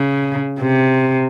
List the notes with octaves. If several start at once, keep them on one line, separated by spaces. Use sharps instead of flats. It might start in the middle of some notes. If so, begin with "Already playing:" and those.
Already playing: C#3
C3